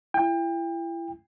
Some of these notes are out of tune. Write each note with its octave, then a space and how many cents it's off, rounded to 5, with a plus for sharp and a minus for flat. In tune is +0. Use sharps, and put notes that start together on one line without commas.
E4 +30 G5 +30